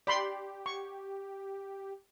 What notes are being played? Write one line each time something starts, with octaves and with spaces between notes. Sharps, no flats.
G4 D5 B5 C6
C#6